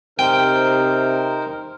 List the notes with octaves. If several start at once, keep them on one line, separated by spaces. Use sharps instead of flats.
C3 D#4 A#4 C5 G5